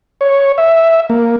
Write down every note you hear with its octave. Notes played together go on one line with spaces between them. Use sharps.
C#5
E5
A#3